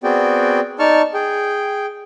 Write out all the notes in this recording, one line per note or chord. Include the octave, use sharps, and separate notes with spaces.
B3 C4 F#4 G#4 D5 G5
D#4 D5 A5 C#6 F6
G#4 G5